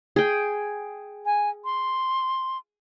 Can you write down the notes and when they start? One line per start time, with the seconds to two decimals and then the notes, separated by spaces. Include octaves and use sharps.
0.16 G#4 G5
1.26 G#5
1.65 C6